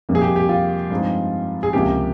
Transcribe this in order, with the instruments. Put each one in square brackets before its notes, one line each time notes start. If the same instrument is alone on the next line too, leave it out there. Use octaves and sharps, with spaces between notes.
[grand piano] F2 C3 G3 A#3
G#4
G4
G4
F4
G2 F3 G#3 C4 D#4
G#4
C#2 C3 F3 A#3 C#4 G4